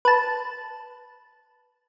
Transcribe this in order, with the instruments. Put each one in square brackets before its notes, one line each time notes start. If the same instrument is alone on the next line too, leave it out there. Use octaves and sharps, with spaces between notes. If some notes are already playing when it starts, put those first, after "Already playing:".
[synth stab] B4 A5